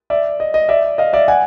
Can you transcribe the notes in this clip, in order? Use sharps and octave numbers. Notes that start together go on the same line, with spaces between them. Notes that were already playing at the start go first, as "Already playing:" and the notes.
D5 E5
D#5
D#5
D5 E5
D#5 F5
D5 E5
F#5 G#5